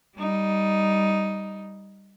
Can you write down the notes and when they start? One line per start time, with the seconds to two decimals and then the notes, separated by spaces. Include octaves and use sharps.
0.17 G3 D#4